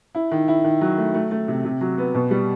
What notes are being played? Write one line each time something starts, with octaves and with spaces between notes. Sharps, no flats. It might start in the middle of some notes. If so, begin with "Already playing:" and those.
E4
D#3
E4
D#3
F#3
A3
A3
A3
C3
C3
F#3
B3
B2
G3